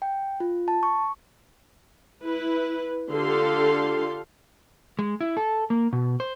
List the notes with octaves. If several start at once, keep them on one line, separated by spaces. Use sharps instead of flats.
G5
F4
A5
C#6
E4 B4
D3 F4 G4 A4 F5 C6
G#3
E4
A4
A#3
B2
C5